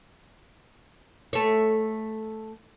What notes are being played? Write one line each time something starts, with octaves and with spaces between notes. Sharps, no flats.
A3 C#5